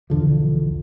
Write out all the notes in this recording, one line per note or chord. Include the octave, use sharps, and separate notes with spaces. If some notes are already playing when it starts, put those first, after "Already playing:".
B1 E2 D3 F3